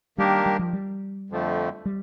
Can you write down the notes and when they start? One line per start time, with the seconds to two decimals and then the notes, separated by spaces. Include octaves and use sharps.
0.18 D#3 G3 A#3 D4 G4 A#4
0.46 G3
0.59 F3
0.73 G3
1.30 F2 D3 F3 A3
1.85 G3